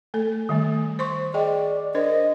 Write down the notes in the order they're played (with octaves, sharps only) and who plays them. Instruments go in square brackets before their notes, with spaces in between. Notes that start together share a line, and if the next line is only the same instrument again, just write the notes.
[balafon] A3 A4
D#3 G3 A3
C5 C6 C#6
[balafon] G#4 D#5 G5 [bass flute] D5
[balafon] D4 A#4 C5 [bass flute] D#5